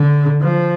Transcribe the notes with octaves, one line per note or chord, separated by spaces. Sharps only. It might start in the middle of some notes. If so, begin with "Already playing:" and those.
Already playing: D3
F3